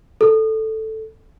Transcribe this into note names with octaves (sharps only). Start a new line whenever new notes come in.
A4